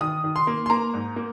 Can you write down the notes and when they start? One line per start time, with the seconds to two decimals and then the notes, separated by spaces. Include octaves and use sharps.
0.01 D#3 D#6
0.24 D#3
0.36 C6
0.47 A#3
0.66 C6
0.70 A#3 A#5
0.93 G#2
1.16 A#3